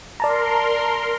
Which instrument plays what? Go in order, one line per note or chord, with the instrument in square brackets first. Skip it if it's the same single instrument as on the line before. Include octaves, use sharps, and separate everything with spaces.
[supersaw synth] A#4 C6 [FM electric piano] D5 A5 A#5